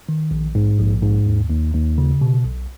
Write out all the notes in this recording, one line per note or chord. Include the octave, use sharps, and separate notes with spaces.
D#3
A#1
G#2
A#1
G#2
D#2
D#2
D#2
C#3
B2
B1